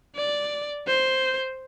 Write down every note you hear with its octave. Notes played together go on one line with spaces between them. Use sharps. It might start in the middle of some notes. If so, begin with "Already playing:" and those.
D5
C5